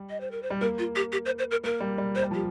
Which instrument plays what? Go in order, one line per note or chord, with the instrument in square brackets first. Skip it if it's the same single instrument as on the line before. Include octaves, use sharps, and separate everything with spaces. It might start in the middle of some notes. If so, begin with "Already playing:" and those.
Already playing: [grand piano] G3
[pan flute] D#5
C5
A#4
C5
[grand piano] G3
[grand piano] A#3 [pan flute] A#4
[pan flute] F4
G4
G4
C5
C5
A#4
[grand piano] A#3 [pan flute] A#4
[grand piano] G3
G3
[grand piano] A#3 [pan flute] C5
[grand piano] G3
F3
[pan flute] G4